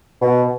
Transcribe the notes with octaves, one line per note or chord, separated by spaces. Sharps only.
B2